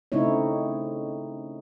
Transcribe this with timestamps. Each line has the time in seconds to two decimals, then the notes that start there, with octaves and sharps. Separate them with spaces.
0.12 C#3 A3 C4 D#4 E4 C#5